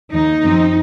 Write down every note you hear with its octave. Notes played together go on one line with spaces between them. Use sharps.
D#2 D#3 A#3 D#4
F#2 F3 C4